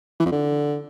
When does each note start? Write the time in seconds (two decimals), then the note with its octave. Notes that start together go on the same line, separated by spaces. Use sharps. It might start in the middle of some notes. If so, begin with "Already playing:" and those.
0.20 E3
0.26 F2
0.32 D3